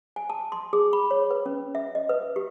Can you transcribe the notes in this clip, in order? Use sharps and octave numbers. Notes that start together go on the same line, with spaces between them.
G#5
A5
C6
G#4
B5
C#5
B4
C#4
E5
D#5
B4
G4